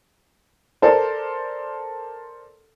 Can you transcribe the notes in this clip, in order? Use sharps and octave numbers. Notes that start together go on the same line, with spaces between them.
A4 A#4 C5 D5